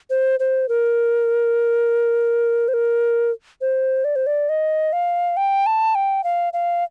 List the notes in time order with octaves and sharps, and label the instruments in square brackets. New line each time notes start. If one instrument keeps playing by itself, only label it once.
[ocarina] C5
C5
A#4
C5
A#4
C5
D5
C5
D5
D#5
F5
G5
A5
G5
F5
F5